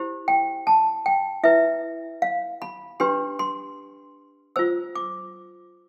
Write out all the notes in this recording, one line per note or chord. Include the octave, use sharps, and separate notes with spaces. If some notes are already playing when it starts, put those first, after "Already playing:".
Already playing: E4 G4 C5
G5
A5
G5
E4 B4 E5
F5
B5
D4 G4 B4 C6
C6
F4 C5 E6
D6